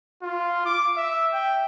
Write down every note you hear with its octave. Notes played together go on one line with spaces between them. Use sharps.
F4
D6
E5
G5